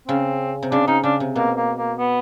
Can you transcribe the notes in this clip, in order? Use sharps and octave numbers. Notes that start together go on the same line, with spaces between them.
C#3 C4
C3
C#3 D4
C#3 D#4
C#3 D4
C3
B2 A#3
A#3
A#3
B3